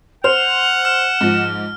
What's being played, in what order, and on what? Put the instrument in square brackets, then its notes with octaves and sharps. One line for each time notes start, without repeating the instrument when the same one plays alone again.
[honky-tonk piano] C5 [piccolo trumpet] F#5 [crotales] F6 [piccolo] F7
[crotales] F6 [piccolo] E7
[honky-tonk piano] G#2 F3